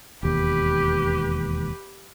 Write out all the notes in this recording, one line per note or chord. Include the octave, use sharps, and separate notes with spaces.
E1 D#2 G4 B4